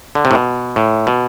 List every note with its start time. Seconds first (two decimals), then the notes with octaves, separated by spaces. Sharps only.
0.15 D3
0.25 C3
0.31 A2
0.35 B2
0.76 A2
1.07 B2